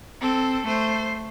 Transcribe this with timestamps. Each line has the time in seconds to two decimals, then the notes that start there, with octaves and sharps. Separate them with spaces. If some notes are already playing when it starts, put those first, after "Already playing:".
0.21 C4 A4
0.67 A3 C5